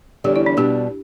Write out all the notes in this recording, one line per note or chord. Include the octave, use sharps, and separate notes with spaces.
E2 D3 G3 C#4 G4
E4
D4
B2 G3 D4 G4